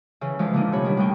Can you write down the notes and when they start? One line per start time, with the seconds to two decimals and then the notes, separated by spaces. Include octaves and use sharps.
0.21 C#3 E3
0.39 D3 E3 F3 G#3
0.53 A#2 D3 A#3 D4 D#4
0.72 C3 G3 C#4 C#5 B5
0.84 D#3 G3
0.97 D2 D3 G3 D#4 G5 C#6